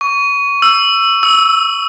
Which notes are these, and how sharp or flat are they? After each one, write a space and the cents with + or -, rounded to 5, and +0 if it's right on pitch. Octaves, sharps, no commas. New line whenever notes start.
C#6 +25
E6 +15
E6 -15